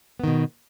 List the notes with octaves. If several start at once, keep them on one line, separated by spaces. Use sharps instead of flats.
B2 D#3 B3